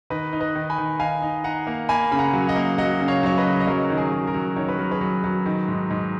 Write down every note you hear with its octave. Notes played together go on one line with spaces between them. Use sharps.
D#3 B4 D#5
D#4
B4 D#5
D#3
G#5 B5
D#3
D#3 F5 G#5
D#4
D#4 F#5 A#5
A#3
A#3 G#5 B5
C#3 B5
F#5 A#5
F#3
D#5 F#5
A#3
F#3 D#5 F#5
C#3
C#5 F5
F#3 C#5
B4 D#5
C#3
D#5
F#3 A#4 C#5
D#3
G#4
F#3
A#4
F#3
D#3 C#5
B4
F#3 A#4
G#4 B4
F#3
F#3
D#3
G#2
G#2